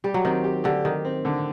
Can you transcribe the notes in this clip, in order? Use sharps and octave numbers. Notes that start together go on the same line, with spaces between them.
G3 G4
F#3
D#3 C4
G4
D3 G4
D#3 G4
C4
D3